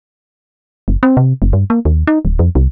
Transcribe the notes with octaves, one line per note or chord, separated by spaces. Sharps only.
F#1
C4
C3
F#1
G2
A#3
D#2
D#4
D1
F2
C2